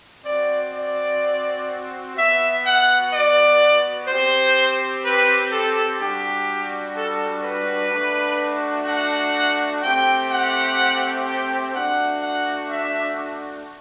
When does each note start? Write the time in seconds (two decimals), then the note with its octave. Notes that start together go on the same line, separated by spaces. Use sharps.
0.24 C4 F#4 D5
0.73 D5
2.16 B3 F#4 E5
2.65 F#5
3.12 D5
4.08 C4 G4 C5
5.05 B4
5.52 A4
6.00 G3 D4 F#4 G4
6.95 A4
7.44 B4
7.92 A3 D4 F#4
8.88 F#5
9.83 A3 C4 G4 G5
10.31 F#5
11.26 G5
11.74 A3 D4 F#4 F#5
12.22 F#5
12.71 E5